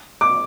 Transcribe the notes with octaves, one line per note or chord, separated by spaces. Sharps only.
D6